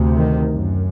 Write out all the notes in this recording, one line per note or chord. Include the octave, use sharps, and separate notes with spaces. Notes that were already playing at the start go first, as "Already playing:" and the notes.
Already playing: D2 C3
D#3
F#2